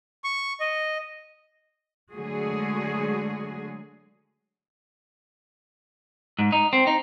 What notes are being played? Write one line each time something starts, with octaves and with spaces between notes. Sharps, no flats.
C#6
D#5
D3 F#3 G#3 A3 F#4 G#4
G#2
D#4
C4
D#4